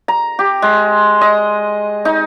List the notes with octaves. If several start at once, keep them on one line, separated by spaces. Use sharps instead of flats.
A#5
G4
G#3
D#5
D#4